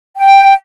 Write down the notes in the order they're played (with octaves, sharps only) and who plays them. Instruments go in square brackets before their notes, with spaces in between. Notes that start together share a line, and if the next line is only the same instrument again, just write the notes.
[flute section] G5